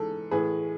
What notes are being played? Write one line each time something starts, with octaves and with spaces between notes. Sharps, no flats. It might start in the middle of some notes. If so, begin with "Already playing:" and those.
Already playing: G#2 E3 A4
A2 E3 G#4 B4